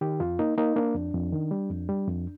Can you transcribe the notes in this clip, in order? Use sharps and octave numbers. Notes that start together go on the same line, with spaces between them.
D#3 G4
F2 F4
A#3 D#4
A#3 D#4
A#3 D4
F2
F2
D#3
G3
F2
G3
F2